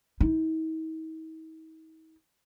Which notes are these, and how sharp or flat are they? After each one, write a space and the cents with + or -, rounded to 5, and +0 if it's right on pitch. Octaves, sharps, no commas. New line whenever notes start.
D#4 +45